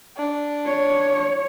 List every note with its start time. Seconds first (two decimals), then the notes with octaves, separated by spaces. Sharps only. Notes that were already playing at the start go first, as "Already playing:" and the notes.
0.18 D4
0.66 C#5